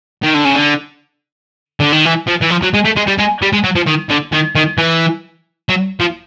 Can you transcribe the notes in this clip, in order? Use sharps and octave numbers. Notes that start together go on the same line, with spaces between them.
D#3
D3
C#3
D3
D3
D#3
E3
F3
E3
F3
F#3
G#3
A3
G#3
G3
G#3
G3
G#3
F#3
F3
D#3
D3
D#3
D#3
E3
F#3
F3